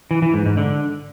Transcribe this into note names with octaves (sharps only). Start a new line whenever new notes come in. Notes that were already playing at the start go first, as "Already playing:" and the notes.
E3
E3
G#2
G#2
D3